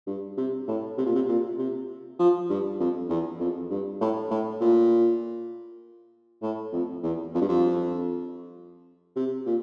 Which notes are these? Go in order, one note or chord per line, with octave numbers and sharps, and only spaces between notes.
G2
C3
A2
C3
A#2
C3
A#2
C3
F3
G2
F2
E2
F2
G2
A2
A2
A#2
A2
F2
E2
F2
G2
F2
C3
A#2